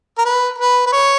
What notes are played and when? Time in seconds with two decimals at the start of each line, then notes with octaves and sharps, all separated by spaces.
0.18 A#4
0.25 B4
0.58 B4
0.86 B4
0.93 C#5